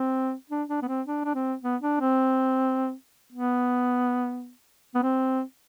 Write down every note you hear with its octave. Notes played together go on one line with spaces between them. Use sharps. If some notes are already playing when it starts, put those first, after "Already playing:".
Already playing: C4
D4
D4
B3
C4
D4
D4
C4
B3
D4
C4
B3
B3
C4